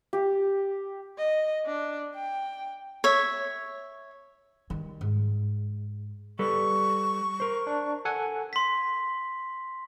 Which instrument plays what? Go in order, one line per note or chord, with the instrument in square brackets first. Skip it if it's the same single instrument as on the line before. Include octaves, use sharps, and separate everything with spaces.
[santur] G4
[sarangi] D#5
D4
G5
[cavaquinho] C#5 E5
[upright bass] D#3 G3
G#2
[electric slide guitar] G3 A4 B4 [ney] C#6
[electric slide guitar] A#4 C5
[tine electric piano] D4
A4 F#5 G#5
[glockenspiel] C6 B6